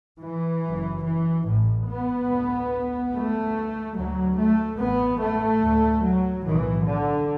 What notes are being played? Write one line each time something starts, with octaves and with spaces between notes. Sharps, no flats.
E3
F#1 F#2
E3
A1 A2
B3
D2
D2 A3
D2 F#3
A3
A1 A2 B3
A3
D2
F#3
B1 A2 E3
D3